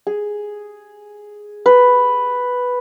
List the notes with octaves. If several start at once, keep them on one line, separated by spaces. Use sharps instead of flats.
G#4
B4